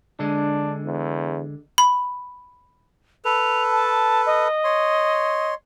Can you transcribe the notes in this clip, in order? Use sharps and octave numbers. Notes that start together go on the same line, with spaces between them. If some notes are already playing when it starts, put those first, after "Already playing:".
D3 G#3 D4
E2
B5
A4 B4 F7
A5
D#5
C#5 C6